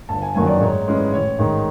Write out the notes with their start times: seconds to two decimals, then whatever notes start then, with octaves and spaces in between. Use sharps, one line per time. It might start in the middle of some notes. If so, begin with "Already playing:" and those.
0.09 G1 A5
0.22 G#5
0.35 F#2 D#3 F#3 A#3 G#5
0.47 D5
0.61 G#2 C#5
0.87 E3 G#3 C#4
1.12 A1 C#5
1.39 G#2 D#3